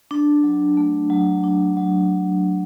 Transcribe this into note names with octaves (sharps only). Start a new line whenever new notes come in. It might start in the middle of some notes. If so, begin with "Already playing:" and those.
D4
F#3
A3
F#3
D4
F#3